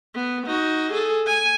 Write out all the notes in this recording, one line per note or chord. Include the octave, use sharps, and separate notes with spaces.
B3
D#4 F#4
G#4 A4
G#5